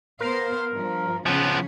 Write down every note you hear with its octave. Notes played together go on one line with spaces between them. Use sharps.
B3 A#4 C5 F5
G2 F3
C#3 F3 B3 C#4 G#4